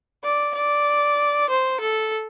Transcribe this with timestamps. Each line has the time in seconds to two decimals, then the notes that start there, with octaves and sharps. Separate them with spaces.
0.24 D5
0.55 D5
1.49 C5
1.80 A4